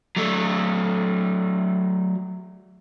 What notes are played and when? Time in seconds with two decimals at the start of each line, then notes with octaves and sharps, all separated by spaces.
0.16 F#3 A3